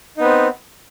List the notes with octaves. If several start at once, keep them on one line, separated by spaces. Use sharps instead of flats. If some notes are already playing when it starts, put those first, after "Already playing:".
B3 C4 D#4